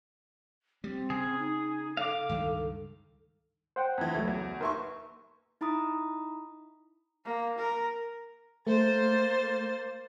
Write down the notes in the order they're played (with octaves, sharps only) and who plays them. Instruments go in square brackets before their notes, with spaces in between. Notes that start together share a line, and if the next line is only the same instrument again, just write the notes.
[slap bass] G3 [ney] C4
[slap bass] C#3 [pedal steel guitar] G#4
[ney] D#4
[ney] A4 [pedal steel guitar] F5 D6
[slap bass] C#2 G2 D#3
[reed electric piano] C5 F#5 G5
[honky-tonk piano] F2 E3
[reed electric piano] C#2 F#3 [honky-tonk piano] A3
[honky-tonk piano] E2
[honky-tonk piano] D#2 C6 C#6 [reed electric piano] A#4 B4 E5
[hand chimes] D#4 E4 A#5 B5 D#6
[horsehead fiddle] A#3
A#4
[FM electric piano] A3 [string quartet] A#3 C5 A6